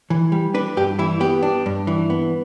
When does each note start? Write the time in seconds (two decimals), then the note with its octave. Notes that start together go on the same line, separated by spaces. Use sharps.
0.10 E3
0.32 G3
0.54 D4 B4
0.77 G2 G4
0.99 E3 E4
1.20 B3 G4
1.43 D4
1.66 G2
1.87 E3
2.10 B3